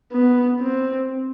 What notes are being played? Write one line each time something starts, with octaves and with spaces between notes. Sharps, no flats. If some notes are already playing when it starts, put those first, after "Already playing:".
B3
C4